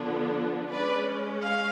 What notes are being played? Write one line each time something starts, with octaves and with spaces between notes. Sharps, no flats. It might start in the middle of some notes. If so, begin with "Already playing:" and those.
Already playing: D3 F3 B3 D4
G#3 C#4 B4 D5
F5